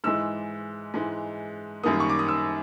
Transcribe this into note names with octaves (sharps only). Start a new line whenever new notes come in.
G#2 E3 G#3 E6
G#2 E3 G#3
F#2 D#3 G3 A#3 D#6
C#6
D6
D#6
E6